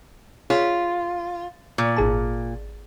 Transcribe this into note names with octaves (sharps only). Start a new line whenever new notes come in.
F4 G#4 C#5 B6
A#2
G#1 G#4 A5